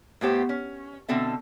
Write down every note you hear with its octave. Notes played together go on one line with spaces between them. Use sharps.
A2 B3 G4 C5
C#4
B2 D3 C4 A4 E5